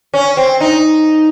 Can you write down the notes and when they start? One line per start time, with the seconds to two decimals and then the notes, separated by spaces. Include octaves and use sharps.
0.14 C#4
0.37 C4
0.61 D#4